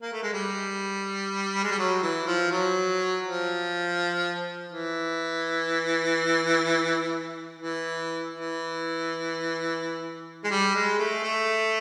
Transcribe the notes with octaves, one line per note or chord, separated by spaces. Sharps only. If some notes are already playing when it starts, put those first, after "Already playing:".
A#3
A3
G#3
G3
G#3
G3
F#3
E3
F3
F#3
F3
E3
E3
E3
G#3
G3
G#3
A3
A3